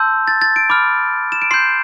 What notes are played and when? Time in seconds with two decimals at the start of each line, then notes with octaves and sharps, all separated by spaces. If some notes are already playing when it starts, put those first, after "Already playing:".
Already playing: A5 C6 E6 G6
0.28 A6
0.42 A6
0.56 D7
0.70 B5 D6 F6
1.32 E7
1.42 D7
1.51 C6 G6 C7